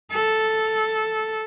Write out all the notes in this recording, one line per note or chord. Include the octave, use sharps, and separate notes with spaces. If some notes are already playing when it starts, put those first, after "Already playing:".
A4